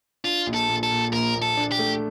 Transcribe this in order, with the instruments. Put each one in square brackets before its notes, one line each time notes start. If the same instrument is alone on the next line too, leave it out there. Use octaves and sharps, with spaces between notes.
[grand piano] D4 [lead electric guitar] F4
[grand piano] A#1
[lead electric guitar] A4
[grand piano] A#2
[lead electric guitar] A4
[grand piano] A#2
[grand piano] A#1 [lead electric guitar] A#4
[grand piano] A#1
[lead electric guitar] A4
[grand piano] D4
[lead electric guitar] G4
[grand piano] A3